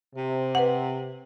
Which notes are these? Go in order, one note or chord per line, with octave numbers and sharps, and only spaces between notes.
C3
B4 F#5